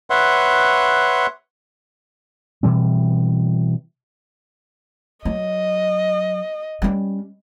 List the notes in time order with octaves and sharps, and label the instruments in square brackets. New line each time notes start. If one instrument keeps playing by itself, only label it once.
[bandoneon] B4 C#5 E5 F#5 C6
[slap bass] B2 E3 G3 C4
[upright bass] F#3 [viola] D#5
[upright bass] G3 C#4